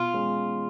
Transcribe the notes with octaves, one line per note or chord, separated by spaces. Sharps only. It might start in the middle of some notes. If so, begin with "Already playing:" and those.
Already playing: B2 F4
G#3 C#4